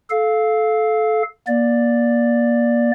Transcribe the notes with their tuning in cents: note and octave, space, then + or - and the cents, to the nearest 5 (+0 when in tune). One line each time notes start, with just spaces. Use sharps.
A4 -20 F5 +0
A#3 +30 D5 +0